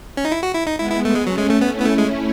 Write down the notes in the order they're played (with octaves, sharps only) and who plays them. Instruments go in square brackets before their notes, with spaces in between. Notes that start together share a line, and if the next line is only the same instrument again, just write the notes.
[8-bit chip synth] C#4
D#4
E4
F#4
E4
D#4
[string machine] G#3 B3 [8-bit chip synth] E4
[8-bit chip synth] E4
A3
G#3
[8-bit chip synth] F#3 [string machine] A3 C#4
[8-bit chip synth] G#3
A3
B3
[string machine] C#4 E4
[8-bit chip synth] B3
A3
G#3